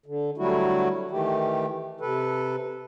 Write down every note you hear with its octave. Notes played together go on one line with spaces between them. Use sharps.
D3
D3 F#3 G3 A3 E4 F#4
D#3 E3 A3 G4
C3 A4 B4